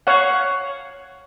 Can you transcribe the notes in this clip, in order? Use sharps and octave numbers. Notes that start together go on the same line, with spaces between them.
C#5 F5 F#5